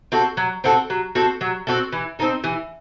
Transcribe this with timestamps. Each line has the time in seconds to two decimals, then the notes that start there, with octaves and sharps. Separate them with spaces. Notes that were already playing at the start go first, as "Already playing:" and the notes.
0.12 C4 F#4 A4
0.37 F#3
0.64 C4 F#4 A4
0.90 F#3
1.15 C4 F#4 A4
1.41 F#3
1.67 C4 F#4 A4
1.92 E3
2.19 C4 D#4 A4
2.44 E3